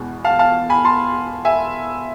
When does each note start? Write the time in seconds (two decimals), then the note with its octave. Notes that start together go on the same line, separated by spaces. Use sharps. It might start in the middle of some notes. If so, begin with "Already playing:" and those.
Already playing: E2 B2 G#3
0.25 F5 A5
0.39 F5 A5
0.70 G#5 B5
0.85 A5 C6
1.45 E5 G#5